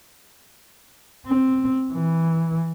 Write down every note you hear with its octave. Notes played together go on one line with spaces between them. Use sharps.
C4
E3